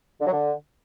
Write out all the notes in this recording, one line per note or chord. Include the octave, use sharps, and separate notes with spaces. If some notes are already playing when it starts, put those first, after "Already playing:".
D3
F#3
D3